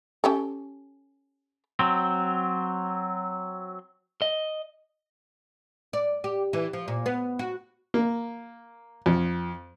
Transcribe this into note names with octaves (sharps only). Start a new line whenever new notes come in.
C#4 G4 A4
F#3 C4
D#5
D5
G4
E3
F3
A#2
B3
F#4
A#3
F2